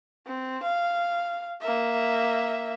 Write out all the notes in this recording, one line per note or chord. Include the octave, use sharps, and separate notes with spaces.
C4
F5
A#3 E5